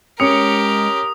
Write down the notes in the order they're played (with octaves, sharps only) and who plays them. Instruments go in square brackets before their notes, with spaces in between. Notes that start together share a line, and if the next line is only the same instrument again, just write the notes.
[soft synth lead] G#3 [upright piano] C#4 C#7 [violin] G4 A#4 [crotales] D#6